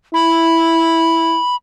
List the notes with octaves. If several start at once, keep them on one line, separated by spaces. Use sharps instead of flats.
E4 B5